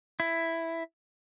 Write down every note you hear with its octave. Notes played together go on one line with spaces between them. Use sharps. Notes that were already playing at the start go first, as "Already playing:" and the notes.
E4